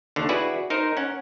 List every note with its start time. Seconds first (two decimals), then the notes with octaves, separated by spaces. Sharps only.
0.16 D#2 D3
0.29 E4 F#4 G#4 B4 D5
0.70 D#4 A#4 C5
0.97 C#4 F#5